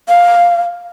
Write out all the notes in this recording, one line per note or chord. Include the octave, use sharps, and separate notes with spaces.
F5